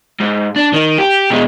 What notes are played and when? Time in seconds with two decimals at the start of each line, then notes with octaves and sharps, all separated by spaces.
0.20 G#2
0.56 D4
0.73 D#3
0.98 G4
1.30 B2 G#3